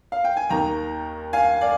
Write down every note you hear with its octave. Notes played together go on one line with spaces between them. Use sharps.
F5
G5
G#5
D#2 D#3 A#3 G5 A#5
F5 G#5
D5 F5